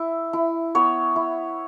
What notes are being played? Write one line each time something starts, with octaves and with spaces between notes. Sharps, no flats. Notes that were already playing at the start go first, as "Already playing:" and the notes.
Already playing: E4 E5
E4
B3 C#5
E4